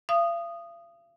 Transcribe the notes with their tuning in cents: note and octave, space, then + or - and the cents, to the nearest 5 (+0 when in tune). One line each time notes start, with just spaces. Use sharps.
F5 -45 D#6 -10